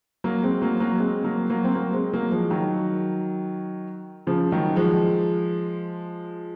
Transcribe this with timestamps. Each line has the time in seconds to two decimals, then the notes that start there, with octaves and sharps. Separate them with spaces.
0.24 F#3 A#3
0.43 G#3 C4
0.62 F#3 A#3
0.80 F#3 A#3
0.99 G#3 C4
1.24 F#3 A#3
1.50 F#3 A#3
1.64 C4
1.75 F#3 A#3
1.93 G#3 C4
2.13 F#3 A#3
2.31 F3 G#3
2.50 D#3 F#3
4.27 C#3 F3
4.52 D#3 F#3
4.76 F3 G#3